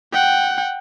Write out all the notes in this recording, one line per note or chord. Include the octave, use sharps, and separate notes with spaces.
F#5 G5